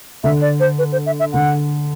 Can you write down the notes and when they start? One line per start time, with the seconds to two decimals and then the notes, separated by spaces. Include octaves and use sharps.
0.24 D3 E5
0.42 D5
0.60 C5
0.79 B4
0.92 C5
1.06 E5
1.20 E5
1.33 D3 F#5